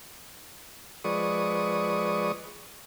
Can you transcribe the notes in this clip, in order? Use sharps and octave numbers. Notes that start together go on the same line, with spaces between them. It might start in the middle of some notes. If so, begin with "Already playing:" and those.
F3 G#3 B4 D5 C#6 D#6